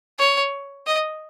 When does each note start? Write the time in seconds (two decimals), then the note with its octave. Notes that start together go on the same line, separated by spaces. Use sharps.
0.19 C#5
0.86 D#5